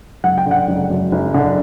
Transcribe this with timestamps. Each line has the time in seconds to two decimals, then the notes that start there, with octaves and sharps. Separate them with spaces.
0.24 F#1 F#5
0.38 G5
0.46 D3 F#5
0.68 F#1
0.90 F#2
1.12 F#1
1.34 D3